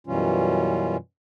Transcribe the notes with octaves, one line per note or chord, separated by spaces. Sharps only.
F#2 B2 E3 G3 C#4 F4